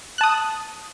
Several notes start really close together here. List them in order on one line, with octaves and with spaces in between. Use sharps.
F#6 A5 D#6